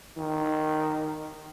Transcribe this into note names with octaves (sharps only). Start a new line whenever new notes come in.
D#3